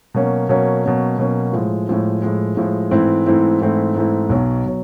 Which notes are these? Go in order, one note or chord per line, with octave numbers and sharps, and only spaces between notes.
B2 F#3 A#3 C#4
B2 F#3 A#3 C#4
B2 F#3 A#3 C#4
B2 F#3 A#3 C#4
A2 F3 G#3
A2 F3 G#3
A2 F3 G#3
A2 F3 G#3
G#2 E3 A3 C4 E4
G#2 E3 A3 C4 E4
G#2 E3 A3 C4 E4
G#2 E3 A3 C4 E4
B1 B2 F#3
B2 F#3